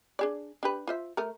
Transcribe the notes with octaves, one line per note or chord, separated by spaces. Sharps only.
D4 G#4 D5
D4 G4 B4
F4 C5 E5
A3 A#4